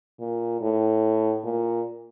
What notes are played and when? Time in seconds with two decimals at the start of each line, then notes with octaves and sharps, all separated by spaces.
0.20 A#2
0.61 A2
1.44 A#2